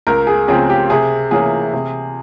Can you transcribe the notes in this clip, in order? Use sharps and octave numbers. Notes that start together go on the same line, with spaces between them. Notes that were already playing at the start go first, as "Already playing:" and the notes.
C#2 A#4
G#4
C#3 F3 C4 G#4
G4
C3 G#4
E3 A#3 C#4 G#4
C3